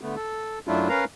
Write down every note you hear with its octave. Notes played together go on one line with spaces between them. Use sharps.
D3 A3 B3
A4
F#2 F#3 A3 D4 E4 F4
C#4 A#4 B4 F5 A#5